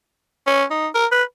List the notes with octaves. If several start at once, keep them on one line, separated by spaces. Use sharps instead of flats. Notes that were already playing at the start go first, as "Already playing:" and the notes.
C#4
D#4
A#4
B4